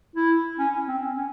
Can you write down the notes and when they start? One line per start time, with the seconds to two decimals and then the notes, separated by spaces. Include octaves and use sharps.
0.16 E4
0.59 C#4
0.88 C4
1.17 C#4